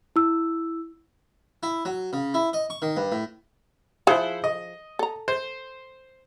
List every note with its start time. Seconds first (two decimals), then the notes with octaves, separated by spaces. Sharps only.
0.16 E4 E6
1.63 E4
1.85 F#3
2.13 C#3
2.34 E4
2.53 D#5
2.70 C#6
2.82 D#3
2.97 G2
3.12 A2
4.07 F3 E4 G#4 C5 F5 F#5
4.44 D#5
4.99 A4 A#5
5.28 C5